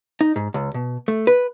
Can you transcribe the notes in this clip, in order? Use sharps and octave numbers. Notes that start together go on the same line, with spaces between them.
D#4
G#2
C#2
B2
A3
B4